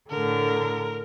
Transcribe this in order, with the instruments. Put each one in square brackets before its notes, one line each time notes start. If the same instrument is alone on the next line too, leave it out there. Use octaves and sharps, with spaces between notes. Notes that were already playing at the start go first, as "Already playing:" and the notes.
[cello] A2 D3 [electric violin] A#4